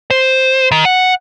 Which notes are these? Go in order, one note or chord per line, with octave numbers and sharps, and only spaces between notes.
C5
D#3
F#5